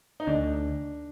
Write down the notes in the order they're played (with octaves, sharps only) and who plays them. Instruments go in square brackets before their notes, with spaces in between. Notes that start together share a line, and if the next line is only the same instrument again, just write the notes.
[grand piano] D#4
[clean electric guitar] D2 [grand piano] D4